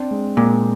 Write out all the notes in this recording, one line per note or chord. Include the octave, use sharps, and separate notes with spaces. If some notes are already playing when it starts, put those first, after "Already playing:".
Already playing: C4 D4
G#3
A#2 G#3